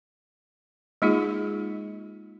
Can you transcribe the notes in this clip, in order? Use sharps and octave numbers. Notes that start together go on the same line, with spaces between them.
G#3 A#3 D#4 F4 G#4